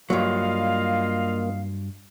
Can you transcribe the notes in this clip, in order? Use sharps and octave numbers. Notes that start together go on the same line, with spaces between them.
G2 F#3 A#3 F4 D#5 F5